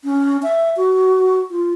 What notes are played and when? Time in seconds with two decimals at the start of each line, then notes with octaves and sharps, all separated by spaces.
0.04 C#4
0.43 E5
0.77 F#4
1.51 F4